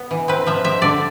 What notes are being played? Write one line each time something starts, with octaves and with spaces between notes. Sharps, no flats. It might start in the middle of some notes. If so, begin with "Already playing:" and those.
Already playing: B3
E3
C4 B4
F3 E5
C4 E5
D3 D5